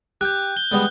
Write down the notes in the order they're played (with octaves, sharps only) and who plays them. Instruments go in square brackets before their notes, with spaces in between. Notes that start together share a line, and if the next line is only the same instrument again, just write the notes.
[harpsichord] G4 [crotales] F#6 G6
[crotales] G7
[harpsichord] G3 G#3 B3